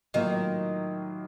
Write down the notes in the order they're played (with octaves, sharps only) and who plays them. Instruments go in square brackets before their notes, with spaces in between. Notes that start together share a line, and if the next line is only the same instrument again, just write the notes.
[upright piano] A2 F#3 A#3 F4 [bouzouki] D#3